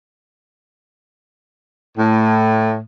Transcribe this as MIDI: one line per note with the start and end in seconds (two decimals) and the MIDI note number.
1.97 2.79 45